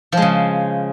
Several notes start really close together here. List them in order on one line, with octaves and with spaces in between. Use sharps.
F3 G#3 C#3